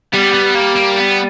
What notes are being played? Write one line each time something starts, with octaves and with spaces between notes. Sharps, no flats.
G3 B3
B3
A#3
A#3
B3